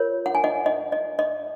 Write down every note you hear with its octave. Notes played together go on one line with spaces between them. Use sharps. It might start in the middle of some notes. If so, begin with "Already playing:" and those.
Already playing: F4 A#4 C#5
F#5
G#5
D#5 F#5
D#5
D#5
D#5